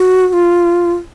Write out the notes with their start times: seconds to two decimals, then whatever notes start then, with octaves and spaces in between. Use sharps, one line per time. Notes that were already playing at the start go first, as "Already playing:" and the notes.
Already playing: F#4
0.28 F#4
0.33 F4